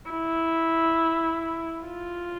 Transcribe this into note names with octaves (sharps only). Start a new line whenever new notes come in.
E4
F4